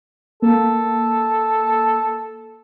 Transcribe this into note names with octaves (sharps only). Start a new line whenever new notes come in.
A#3 A4